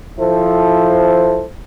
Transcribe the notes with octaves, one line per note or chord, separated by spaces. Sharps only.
F3 E4 A4 C5